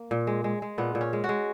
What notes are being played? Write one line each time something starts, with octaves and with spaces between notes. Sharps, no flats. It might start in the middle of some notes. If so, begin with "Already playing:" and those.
Already playing: A#3
A#2
G#3
G#3
G#3
A#2 B3
A#2
C#4
G#3
F#4
G#3